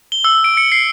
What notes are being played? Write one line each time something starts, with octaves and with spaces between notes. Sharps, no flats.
G7
E6
D7
C#7
C7